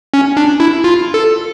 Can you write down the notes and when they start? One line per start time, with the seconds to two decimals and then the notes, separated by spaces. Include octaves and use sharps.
0.14 C#4
0.37 D4
0.60 E4
0.84 F4
1.14 A4